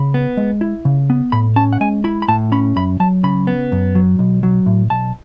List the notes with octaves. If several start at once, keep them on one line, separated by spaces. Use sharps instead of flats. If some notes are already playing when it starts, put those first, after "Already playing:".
Already playing: C#3 B5
B3
G#3
E4
C#3
B3
A2 B5
C#4 A5
F#5
G#3 G#5
E4 B5
B5
A2 A5
C#4 B5
F#2 B5
F#3 A5
C#3 B5
B3
F#2
F#3
B1
F#3
A2
B1 A5